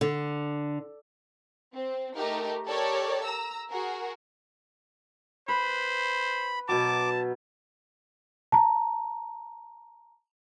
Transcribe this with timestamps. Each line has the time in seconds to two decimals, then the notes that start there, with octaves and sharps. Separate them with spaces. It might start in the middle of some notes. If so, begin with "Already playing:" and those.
0.01 D3
1.74 C4
2.15 A3 D#4 G4 A#4
2.67 G4 A4 A#4 C#5 D5
3.24 A#5 E6
3.70 F#4 G#4 A#4
5.48 B4 C5 B5
6.69 B2 F#3 A5 D6
8.52 A5 A#5